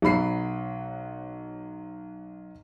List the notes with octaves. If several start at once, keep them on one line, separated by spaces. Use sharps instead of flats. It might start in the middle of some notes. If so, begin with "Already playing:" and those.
B1 F#3 B5 C7